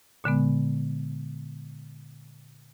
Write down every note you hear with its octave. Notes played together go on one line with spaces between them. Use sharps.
A#2 D3 G#3 B3